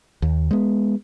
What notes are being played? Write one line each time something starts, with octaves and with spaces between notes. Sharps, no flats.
D#2
G#3 B3